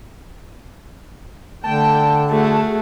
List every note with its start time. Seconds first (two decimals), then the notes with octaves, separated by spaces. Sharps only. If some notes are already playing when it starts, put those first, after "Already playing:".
1.64 D3 A3 D5 G5 A5
2.31 A3 F#4 G#4